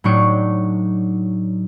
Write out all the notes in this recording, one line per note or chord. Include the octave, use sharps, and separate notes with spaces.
A2 F#3 D4 D#4 C#6 D7